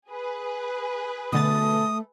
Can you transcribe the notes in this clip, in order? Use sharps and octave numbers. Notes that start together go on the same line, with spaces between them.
G#4 B4
B2 D3 A3 D#6 A6